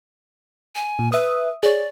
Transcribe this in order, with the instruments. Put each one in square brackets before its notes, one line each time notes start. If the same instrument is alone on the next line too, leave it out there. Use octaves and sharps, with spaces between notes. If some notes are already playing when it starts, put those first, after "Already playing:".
[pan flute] G#5
[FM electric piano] A#2
[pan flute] B4 [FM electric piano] E5 D#6
[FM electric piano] G#4 C#5 [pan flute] D5